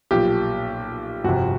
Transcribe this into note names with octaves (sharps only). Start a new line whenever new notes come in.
B1 A#2 F3 G4
G1 F2 C3 F#4